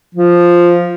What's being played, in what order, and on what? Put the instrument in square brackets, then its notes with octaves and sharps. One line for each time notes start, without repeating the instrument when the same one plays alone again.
[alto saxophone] F3